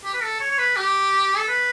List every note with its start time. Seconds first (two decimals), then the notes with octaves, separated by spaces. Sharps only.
0.04 G4
0.14 B4
0.22 A4
0.40 C#5
0.51 C#5
0.58 B4
0.76 G4
1.38 A4
1.48 B4